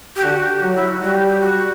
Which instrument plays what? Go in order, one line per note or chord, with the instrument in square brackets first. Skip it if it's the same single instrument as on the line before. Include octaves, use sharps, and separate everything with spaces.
[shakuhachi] G4
[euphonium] D3 [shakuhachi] F#4
[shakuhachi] G4
[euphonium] F#3 [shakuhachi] F#4
[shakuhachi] E4
F#4
[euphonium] G3 [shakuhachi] F#4
[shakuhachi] G4
G4
F#4